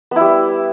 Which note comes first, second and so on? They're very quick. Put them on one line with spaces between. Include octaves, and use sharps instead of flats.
B3 E4 G3